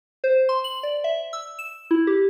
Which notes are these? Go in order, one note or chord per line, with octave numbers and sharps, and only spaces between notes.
C5
C6
F#7
D5
E5
E6
E7
E4
G4